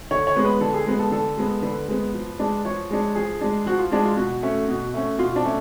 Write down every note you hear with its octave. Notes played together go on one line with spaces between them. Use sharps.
D3 C#5
C#5
G#3 B3
B4
D3 A4
G#4
G#3 B3
A4
D3 A4
G#3 B3
D3 B4
G#3 B3
F3
G#3 D4
F3 C#5
G#3 D4
F3 G#4
G#3 D4
F3 F#4
F4
G#3 D4
F4
B2 F#4
A3 C#4
B2
A3 C#4
B2 F4
D4
A3 C#4